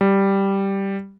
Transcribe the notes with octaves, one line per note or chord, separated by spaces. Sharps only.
G3